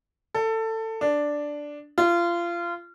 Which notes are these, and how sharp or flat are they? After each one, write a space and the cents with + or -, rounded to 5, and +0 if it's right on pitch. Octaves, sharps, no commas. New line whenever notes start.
A4 +20
D4 +0
F4 -25